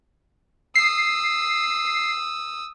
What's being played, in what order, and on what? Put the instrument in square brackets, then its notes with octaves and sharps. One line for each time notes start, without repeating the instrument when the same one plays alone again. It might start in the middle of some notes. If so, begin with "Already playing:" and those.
[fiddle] D#6 E6 [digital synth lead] C7